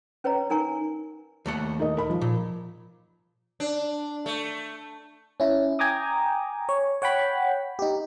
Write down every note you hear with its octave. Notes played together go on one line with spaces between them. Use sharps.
C#4 B4 C#5 D#5 A#5
D#4 A#4 G#5 A#5 C#6
D#2 A3 F#5
D#4 A#4 D#5
A#4 B5
F3
A#2
D4
A3
C#4 E4
G5 G#5 A#5 D6 D#6
C#5
C#5 F#5 G5 B5
D#4 G4